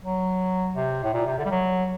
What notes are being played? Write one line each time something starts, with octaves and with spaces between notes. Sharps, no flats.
F#3
C3
A2
A#2
C3
D3
G3
F#3